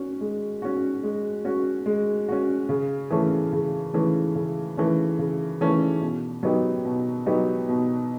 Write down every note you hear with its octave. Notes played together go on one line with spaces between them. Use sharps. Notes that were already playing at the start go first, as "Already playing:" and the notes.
Already playing: C#4 F#4
G#3
C#4 F#4
G#3
C#4 F#4
G#3
C#4 F#4
C#3
E3 A3 C#4
C#3
E3 A3 C#4
C#3
E3 A3 C#4
C#3
E3 A3 C#4
B2
F#3 B3 D#4 G4
B2
F#3 B3 D#4 G4
B2